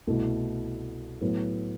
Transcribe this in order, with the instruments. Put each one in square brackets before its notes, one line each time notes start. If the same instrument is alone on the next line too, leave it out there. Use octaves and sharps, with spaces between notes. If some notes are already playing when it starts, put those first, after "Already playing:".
[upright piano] C2 B2 A3 E4
A2 F#3 B3